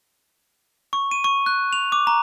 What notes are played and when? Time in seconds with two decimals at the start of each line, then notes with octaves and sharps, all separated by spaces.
0.93 C#6
1.11 D#7
1.24 C#6
1.46 F#6
1.73 F7
1.92 D6
2.07 A#5